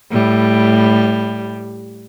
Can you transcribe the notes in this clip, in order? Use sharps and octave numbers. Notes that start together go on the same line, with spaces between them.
A2 G3